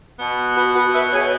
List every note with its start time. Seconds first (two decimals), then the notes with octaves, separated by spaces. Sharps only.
0.19 B2 B3
0.56 F#4 B4
0.75 F#4 B4
0.94 B4 E5
1.12 G#4 C#5